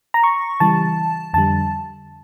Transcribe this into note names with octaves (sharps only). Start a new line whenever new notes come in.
A#5
C#6
C#3 E3 G3 A5
F2 D3 G3 A5